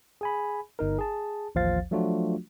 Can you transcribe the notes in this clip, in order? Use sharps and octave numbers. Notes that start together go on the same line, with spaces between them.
G#4 G#5 B5
G1 D#4 A#4
G#4 A5
A1 D#2 F3 C5 F5 A6
F3 F#3 A3 D4 F4 F#4